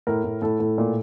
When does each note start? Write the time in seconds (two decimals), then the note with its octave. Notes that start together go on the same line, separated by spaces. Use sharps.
0.07 A2 A#4
0.24 A2
0.42 A2 A4
0.60 A2
0.78 A#2